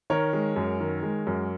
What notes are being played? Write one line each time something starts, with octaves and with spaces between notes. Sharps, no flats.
D#3 A#4 C#5
G#3
F#2
D#3
G#3
F#2